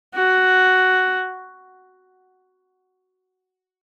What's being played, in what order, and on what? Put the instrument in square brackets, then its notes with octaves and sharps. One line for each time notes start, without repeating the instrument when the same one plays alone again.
[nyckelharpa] F#4